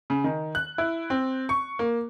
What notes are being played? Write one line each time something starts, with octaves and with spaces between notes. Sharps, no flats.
C#3
D#3
F#6
E4
C4
C#6
A#3